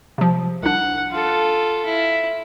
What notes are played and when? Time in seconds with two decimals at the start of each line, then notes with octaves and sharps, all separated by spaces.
0.18 C3 F3
0.63 C2 D4 F#5
1.11 F4 A4
1.85 E4